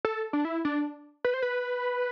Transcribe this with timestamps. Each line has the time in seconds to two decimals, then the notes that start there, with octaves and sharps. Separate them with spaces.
0.05 A4
0.33 D4
0.45 E4
0.65 D4
1.25 B4
1.34 C5
1.42 B4